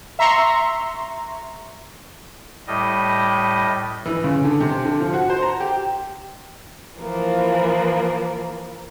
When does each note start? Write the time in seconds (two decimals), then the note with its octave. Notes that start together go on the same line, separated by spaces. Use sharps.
0.19 E5 A#5 C6 C#6
2.67 A2 G3 D#5
4.05 E3
4.24 C#3
4.44 D3
4.60 C3
4.85 D3
5.00 F3
5.14 F#4
5.30 C5
5.42 A#5
5.60 G4
6.98 E3 F3 A#3